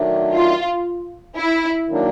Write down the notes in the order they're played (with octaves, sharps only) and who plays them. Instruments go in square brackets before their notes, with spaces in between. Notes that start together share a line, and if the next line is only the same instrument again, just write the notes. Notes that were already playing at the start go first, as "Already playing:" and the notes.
Already playing: [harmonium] D#3 F#3 A3 D4
[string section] F4
E4
[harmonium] D#3 F#3 A#3 D4